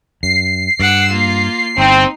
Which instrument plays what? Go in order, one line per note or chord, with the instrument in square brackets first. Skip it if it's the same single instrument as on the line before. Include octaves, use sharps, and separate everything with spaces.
[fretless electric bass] F#2 [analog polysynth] C7
[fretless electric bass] G2 [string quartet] F#5 D6 E6
[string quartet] A#3 F4
[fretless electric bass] G1 [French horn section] C4 [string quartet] D#4